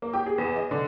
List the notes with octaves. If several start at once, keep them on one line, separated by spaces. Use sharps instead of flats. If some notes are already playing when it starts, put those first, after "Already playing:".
A#3
G4
G#4
E2
D#5
D3